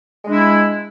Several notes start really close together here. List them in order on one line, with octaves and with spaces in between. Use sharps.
G#3 D4 E4